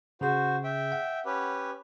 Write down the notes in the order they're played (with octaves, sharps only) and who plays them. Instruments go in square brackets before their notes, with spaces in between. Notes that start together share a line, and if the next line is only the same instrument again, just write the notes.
[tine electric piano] C#3 G#4 [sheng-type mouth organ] F#4 C5
[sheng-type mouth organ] E5 G5
[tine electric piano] F#5
[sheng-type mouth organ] C#4 G4 B4